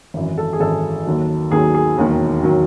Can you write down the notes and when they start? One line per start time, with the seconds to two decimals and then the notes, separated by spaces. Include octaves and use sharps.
0.14 G#1 F#2 E3
0.38 A4
0.53 G#4
0.60 G#1 F#2 E3 A4
1.06 D#2 D#3 F#3
1.51 D#2 D#3 F#3 G#4
1.74 G#4
1.97 E1 D#2 D#3 F#3
2.43 D#3 F#3